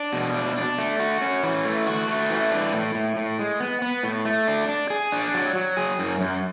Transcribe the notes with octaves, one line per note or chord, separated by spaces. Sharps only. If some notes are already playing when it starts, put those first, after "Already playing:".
Already playing: D4
B2
D4
D4
A3
F#4
C#4
E3
A3
F#4
A3
E3
D4
A2
A2
A2
G#3
B3
B3
A2
A3
D4
D4
G#4
D4
F#3
F#3
G#4
F#2
F#2